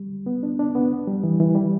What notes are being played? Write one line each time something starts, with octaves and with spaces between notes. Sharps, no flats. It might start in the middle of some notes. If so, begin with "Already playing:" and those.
Already playing: G3
B3
D4
D4
B3
G3
E3
E3
G3